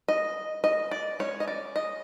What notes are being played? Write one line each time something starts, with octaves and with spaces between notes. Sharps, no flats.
D#5
D#5
D5
G#3 C#4 C#5
D#5
D5
D#5